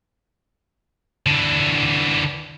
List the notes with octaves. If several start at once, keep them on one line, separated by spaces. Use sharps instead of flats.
D3 E3